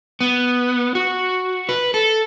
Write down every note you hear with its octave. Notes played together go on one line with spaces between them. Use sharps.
B3
F#4
B4
A4